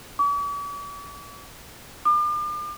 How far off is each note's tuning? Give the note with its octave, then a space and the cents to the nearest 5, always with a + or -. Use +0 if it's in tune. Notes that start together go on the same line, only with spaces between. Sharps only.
D6 -45
D6 +40